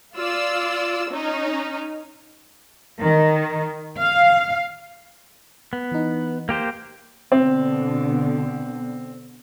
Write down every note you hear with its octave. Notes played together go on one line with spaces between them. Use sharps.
F4 D5 E6
C#4 D#4
D#3
F5
B3
E3 D#4
A#3 G4 C5
B2 D3 C4